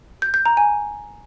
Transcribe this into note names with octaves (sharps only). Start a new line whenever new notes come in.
G6
G6
A#5
G#5